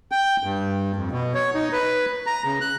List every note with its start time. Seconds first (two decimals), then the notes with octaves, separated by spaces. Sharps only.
0.12 G5
0.43 G2
0.96 F2
1.11 B2
1.34 C#5
1.54 D#4
1.73 B4
2.26 A#5
2.45 C#3
2.61 F#6